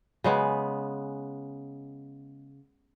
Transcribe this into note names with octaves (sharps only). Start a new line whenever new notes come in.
C#3 G#3 B3